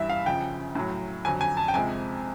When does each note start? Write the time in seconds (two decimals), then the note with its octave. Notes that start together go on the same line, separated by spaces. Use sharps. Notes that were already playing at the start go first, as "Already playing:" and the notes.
Already playing: G2 E3 G3 E5
0.10 F5
0.26 F#2 C#3 F3 G5
0.75 A2 F#3
1.25 F2 D3 F#3 G#5
1.41 G#5
1.57 A5
1.68 G5
1.74 F2 C3 F3 G#3 G#5